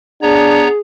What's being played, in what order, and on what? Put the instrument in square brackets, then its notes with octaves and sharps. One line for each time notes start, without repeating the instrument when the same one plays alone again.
[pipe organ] B3 C#5 A#5 [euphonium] D4 [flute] G#4